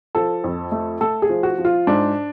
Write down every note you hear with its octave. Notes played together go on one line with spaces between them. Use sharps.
F3 A4
F2
A3
A3 A4
G#4
F3
F#4
F3
F4
G#2 D4